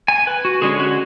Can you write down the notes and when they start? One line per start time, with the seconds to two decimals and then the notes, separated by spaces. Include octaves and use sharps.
0.08 G#5
0.27 B4
0.45 F#4
0.62 D3 G#3 C#4 G#4
0.79 F#4